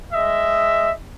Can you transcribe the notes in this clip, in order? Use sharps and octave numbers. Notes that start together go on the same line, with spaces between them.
G#3 D#5 E5